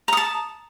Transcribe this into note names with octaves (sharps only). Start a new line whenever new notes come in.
A5 A#5 D#6